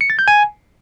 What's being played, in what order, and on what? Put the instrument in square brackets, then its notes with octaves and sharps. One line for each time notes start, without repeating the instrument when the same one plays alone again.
[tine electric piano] C#7
A6
G6
G#5